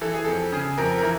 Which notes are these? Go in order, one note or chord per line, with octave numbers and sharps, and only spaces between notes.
E3 A4
G#4
F2 A4
C#3 G#4
F2 A#4
A#4
E3